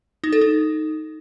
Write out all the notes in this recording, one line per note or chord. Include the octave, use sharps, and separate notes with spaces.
D#4
A4
D#4